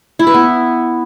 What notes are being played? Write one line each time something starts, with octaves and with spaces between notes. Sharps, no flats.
E4
B4
B3